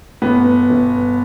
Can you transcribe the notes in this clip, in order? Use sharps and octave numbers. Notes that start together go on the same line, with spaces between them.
G1 B3
G1